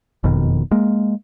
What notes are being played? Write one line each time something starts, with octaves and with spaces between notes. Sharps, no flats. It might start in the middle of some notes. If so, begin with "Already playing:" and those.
F#1 F2 B2 D#3
G#3 A#3